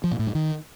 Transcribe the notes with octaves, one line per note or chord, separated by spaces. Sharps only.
F3
A#2
A2
G2
D#3